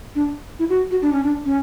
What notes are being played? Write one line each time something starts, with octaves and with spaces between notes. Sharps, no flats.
D4
E4
F#4
F#4
D4
C#4
D4
C#4